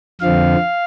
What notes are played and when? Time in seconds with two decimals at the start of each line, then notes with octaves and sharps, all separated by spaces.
0.20 F2 D3 F3 C4 F5